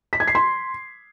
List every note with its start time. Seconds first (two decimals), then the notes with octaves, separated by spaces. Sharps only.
0.13 B6
0.20 G#6
0.27 C7
0.35 C6